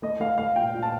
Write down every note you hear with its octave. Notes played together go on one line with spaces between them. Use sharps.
A3 D#5
A3 F5
A3 F5
A#2 G5
A#2
A5